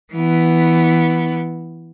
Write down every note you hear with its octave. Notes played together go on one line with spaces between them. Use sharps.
E3 B3